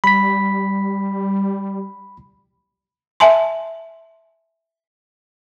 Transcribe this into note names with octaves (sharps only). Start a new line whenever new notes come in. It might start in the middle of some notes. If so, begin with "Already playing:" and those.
G3 B5 B6
E5 G#5 A5 C6